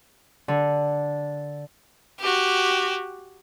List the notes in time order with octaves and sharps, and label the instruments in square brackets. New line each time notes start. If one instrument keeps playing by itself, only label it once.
[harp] D3
[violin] F#4 G4